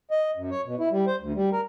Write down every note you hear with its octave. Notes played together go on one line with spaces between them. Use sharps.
D#5
F#2
C#5
B2
E4
G3
C5
D2
G3
A#4